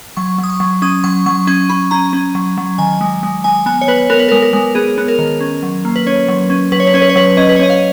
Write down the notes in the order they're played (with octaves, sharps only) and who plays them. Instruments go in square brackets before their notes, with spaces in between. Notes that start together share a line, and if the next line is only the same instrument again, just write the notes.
[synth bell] F#3 C#6
F#3
D#6
C#6
F#3
C#4 D#6
F#3 C#6
F#3 C#6
C#4 C#6
C#4 B5
C#4 A#5
C#4
F#3
F#3
D#3 G#5
G#3
G#3
G#3 G#5
B3 G#5
C#5
B3 B4
B3 A#4
B4
G#3 A#4
A#4
G#3
B3 G#4
B3
A#4
D#3
C#4
F#3
A#3
B4
C#4 C#5
F#3
C#4
F#3 B4
C#5
B4
C#4 C#5
B4
C#5
F#3 B4
C#4 D#5
B4
C#5
C#4 D#5
F5